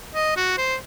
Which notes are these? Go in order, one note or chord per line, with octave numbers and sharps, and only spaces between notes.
D#5
F#4
C5